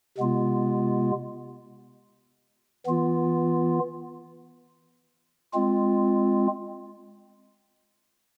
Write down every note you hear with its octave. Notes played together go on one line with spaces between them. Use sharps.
C3 G#3 B3 F4
E3 B3 F4
G#3 C4 F4